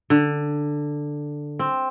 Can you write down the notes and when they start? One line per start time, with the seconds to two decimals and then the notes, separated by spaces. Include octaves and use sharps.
0.10 D3
1.59 C4